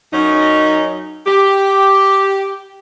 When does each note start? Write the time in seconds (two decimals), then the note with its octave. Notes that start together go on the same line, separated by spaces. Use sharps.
0.12 F#2 C#4 D#4
1.25 G4